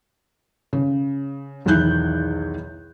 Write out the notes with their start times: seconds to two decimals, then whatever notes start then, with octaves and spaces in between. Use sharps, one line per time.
0.73 C#3
1.65 B1 E2 D#3 E4 F#6 G6